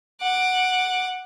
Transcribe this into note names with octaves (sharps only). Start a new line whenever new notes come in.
F#5 D6